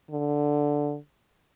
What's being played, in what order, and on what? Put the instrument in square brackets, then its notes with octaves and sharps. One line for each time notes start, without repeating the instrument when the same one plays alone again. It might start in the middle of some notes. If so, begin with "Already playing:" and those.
[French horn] D3